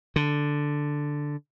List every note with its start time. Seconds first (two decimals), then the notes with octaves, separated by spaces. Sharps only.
0.16 D3